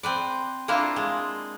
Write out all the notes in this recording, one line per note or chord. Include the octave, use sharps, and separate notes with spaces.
C4 B4 D5
A#3 D4 E4 F4
G#3